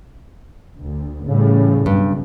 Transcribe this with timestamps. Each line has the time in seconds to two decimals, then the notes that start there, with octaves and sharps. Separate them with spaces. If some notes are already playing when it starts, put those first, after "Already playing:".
0.79 D2
1.26 A2 C#3 E3 G3
1.86 B1 G2 C#3